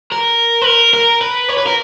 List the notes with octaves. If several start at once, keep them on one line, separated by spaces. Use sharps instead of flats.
A#4
B4
A#4
A#4
B4
C#5
B4
A#4